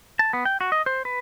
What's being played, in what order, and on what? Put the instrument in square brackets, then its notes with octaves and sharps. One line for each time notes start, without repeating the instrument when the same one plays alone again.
[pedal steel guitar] A5
B3
G5
F#4
D#5
C5
B4